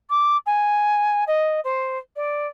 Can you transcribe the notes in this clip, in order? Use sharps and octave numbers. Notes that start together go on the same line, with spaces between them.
D6
G#5
D#5
C5
D5